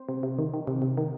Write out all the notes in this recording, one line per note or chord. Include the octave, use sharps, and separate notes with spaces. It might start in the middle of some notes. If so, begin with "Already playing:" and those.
Already playing: C4 C5
C3
C3
D#3
D#3
C3
C3
D#3